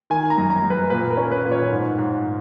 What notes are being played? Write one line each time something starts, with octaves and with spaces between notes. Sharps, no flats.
D#3 G#5
A#5
F#2
A#5
F#2
B4
A#2 B4
A#4
C#4
B4
A#2
C#5
G#2
G#2